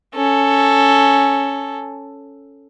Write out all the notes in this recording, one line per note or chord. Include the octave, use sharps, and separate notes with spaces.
C#4 A4